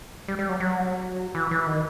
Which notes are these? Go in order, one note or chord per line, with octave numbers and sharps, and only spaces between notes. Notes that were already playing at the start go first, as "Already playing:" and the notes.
G3
G3
F#3
F#3
E3
E3
D#3